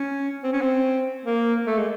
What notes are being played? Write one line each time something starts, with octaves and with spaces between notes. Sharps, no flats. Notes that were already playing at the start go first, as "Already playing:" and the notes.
Already playing: C#4
C4
C#4
C4
A#3
A3
G#3